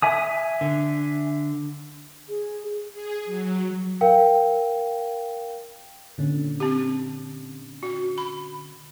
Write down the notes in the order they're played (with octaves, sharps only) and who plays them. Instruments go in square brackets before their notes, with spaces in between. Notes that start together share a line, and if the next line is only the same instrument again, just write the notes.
[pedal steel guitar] E5 G#5 D#6
[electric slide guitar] D3
[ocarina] G#4
[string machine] G#4
F#3
[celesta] A#4 F5 G5
[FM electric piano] A#2 D3 C#4
[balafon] C4 G4
F#4
B5